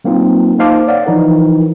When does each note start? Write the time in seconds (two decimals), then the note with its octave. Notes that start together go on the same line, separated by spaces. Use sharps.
0.04 F#3 A#3 C4 D#4 F4
0.59 A#3 D#4 C5 F5 A5 D6
0.88 C#5 D5 F5 F#5
1.06 E3 F3 D#4 E4 A#4